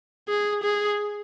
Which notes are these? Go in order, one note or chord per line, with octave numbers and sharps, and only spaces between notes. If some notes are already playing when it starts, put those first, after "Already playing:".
G#4
G#4